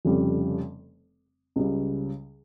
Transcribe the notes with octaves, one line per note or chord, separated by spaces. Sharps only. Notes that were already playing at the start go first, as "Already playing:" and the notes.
F1 F2 C#3 G3
C#2 C#3 G3